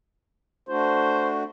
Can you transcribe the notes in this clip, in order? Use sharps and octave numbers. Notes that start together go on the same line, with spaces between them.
A3 D4 F#4 C5